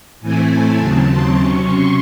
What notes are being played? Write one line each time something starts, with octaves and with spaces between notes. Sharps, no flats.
A2 E3 A3 C4 E4 G#5
A5
D#2 C#3 F#3 C4
C6
C3 F#3 C#4 C#6
C6